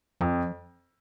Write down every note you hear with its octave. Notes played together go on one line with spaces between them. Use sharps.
F2 F3